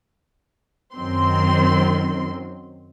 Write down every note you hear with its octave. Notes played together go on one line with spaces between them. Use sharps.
F#2 D#3 F#3 C4 C6